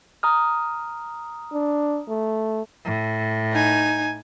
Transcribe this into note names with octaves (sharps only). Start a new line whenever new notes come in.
A#5 D#6 F6
D4
A3
A2
D#4 G#5